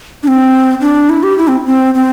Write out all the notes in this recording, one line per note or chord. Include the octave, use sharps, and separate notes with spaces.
D4
C4
D4
E4
G4
E4
C4
C4
C4